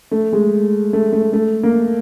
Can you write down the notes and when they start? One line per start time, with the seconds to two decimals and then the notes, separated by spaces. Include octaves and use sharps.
0.11 A3
0.33 G#3
0.93 A3
1.13 A3
1.33 A3
1.63 A#3